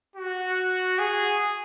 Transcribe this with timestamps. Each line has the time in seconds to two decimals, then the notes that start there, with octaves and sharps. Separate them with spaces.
0.16 F#4
0.99 G#4